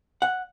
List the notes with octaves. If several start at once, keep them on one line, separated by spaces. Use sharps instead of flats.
F#5